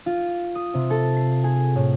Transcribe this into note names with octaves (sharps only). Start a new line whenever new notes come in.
F4
D#6
C3
A4
C7
G#4
A2